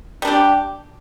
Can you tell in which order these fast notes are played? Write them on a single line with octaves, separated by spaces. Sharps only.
G3 D4 G4